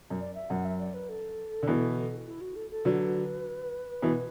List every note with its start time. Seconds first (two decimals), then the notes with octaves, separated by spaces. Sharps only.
0.10 F#2
0.20 D5
0.35 E5
0.50 F#2 F#5
0.65 E5
0.79 D5
0.94 B4
1.09 A4
1.63 D3
1.68 B2 E3
2.27 E4
2.41 F#4
2.56 A4
2.71 A4
2.85 D3 F#3 B4
4.02 B2 E3